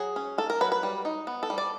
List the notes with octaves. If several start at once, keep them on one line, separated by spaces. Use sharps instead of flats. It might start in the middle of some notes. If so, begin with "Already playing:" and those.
Already playing: F#3 G#4
C#4
A#3 A4
A#4
F#3 B4
B4
G3
D#4
B3
A4
G3
D5